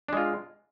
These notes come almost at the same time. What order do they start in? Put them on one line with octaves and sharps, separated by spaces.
D4 G#3 F4